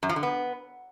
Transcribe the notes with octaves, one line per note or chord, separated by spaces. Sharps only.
F#2
F3
D3
B3